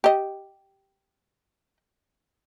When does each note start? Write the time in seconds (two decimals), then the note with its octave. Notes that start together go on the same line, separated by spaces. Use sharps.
0.04 G4 D#5